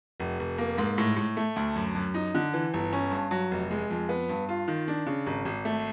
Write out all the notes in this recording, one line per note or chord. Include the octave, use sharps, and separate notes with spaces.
F1
F1
A#3
G#2
A2
A2
A3
D2
F#2
F#2
D#4
D3
E3
G1
C#4
G2
F#3
F1
G#3
F2
B3
G2
F4
D#3
D4
C#3
G#1
G#1
A3